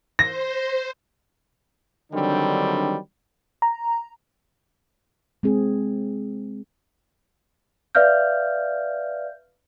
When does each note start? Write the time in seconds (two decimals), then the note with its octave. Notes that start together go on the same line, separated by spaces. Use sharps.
0.19 C5 A#6
2.12 D3 D#3 F#3 G3 C4 D4
3.62 A#5
5.43 G#3 C4 G#4
7.95 B4 D5 E5 F5 F6 G6